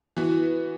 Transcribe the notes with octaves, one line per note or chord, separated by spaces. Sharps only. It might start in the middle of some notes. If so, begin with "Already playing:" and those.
E3 B3 F#4